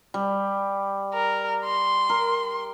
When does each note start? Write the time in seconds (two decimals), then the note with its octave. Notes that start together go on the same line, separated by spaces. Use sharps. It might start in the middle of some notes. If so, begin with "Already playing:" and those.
0.14 G3
1.14 A#4
1.65 C6
2.09 A#4